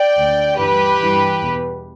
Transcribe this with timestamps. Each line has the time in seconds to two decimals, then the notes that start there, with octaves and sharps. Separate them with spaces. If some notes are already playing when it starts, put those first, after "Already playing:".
Already playing: D5 G5
0.17 D2 D3
0.59 G2 E3 G4 B4
1.01 G2 E3
1.42 E2 B2